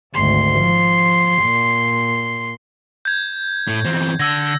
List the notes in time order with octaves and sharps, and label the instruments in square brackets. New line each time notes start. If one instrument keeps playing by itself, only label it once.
[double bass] G#1 D2 [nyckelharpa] C6
[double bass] F3
A#2
[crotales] G6 G#6
[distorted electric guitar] A2
E2 C4
[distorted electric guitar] D3 [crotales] E6 G#6 A#6